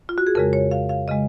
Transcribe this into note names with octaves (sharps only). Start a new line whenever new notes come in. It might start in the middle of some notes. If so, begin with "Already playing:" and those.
F4
F#4
G#4
F2 C#3 G#3 A#4
C#5
F5
F5
C#3 G#3 D#5